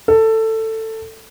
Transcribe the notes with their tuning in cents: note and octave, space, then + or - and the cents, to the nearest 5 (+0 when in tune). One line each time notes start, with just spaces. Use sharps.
A4 +15